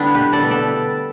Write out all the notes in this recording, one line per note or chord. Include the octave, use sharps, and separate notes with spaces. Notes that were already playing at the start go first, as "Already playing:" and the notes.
Already playing: D3 G3 A3 B3 D4 E4
B2 G4 B4
A4 D5
G3 B3
A4 D5